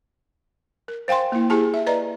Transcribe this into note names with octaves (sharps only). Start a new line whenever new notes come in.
A#4
C5 F5 G5 G#5 C6
A#3 E4
E4 G4 G#4 G#5 A5
E5
B4 D5 D#5 A#5